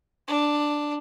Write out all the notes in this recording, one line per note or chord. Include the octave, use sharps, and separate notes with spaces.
D4